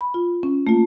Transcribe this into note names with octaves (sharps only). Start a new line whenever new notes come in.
B5
F4
C#4
A3 A#3 F4